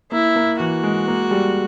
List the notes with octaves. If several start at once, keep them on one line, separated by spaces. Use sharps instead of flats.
A#3 E4
A#3
E3 F#4
G#3
A#3
G3